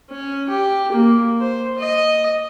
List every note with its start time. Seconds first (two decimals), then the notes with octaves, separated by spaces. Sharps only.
0.11 C#4
0.49 G4
0.92 A#3
1.40 C5
1.78 D#5